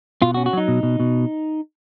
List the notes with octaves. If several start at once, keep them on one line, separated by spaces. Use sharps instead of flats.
B2 F4
F#4
C#4
F#4
F#3 D#4
B2
B2
B2